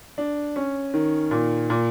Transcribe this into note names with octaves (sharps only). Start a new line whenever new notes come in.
D4
C#4
D#3
A#2
A#2